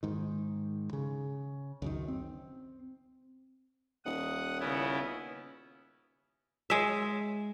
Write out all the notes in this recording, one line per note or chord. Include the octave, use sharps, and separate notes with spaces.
G#2 D#3
C#3
C#2 F#2 D#3
C4
D#1 F#5 D#6
C#3 B3 E4
G#3 E5